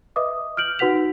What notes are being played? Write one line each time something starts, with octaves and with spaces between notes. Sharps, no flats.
B4 D#5 E5 D6 D#6
F6 G6 D7 F#7
D#4 F#4 B4 F#5 B6 F7